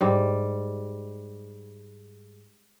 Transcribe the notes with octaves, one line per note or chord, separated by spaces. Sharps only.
G#2 G3